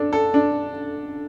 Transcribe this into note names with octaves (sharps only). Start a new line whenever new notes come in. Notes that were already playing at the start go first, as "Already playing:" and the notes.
Already playing: D4 A4
A4
D4